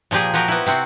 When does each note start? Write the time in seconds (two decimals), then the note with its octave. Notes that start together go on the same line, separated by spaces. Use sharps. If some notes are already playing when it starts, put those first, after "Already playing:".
0.11 A#2 F3 A#3 G4 G#4
0.34 F3 F#4 G4 A#4
0.48 B3 E4
0.66 C3 C4 F#4